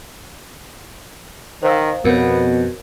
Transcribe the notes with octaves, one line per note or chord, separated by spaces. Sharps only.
D#3 C5 F5 E6
F2 B2 B3 A#4 C#5